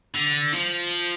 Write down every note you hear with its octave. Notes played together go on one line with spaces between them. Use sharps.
D3
F3